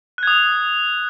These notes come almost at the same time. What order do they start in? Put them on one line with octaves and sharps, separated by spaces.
F#6 G#6 D#6